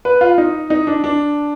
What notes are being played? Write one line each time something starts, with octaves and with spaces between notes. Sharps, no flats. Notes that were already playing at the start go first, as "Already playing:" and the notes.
B4
F4
D#4
D#4
D4
D4